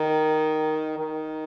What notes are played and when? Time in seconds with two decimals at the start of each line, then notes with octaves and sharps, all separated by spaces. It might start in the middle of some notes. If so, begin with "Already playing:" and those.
Already playing: D#3
0.99 D#3